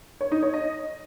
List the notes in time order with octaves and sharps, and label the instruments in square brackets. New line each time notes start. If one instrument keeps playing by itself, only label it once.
[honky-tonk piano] C#5
D#4
C#5
D#5